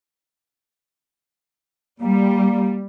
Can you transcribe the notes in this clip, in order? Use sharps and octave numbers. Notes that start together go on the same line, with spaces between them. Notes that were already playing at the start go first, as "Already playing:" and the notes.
G3 A#3